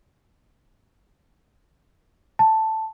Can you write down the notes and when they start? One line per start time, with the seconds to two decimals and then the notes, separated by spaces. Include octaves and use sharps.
2.39 A5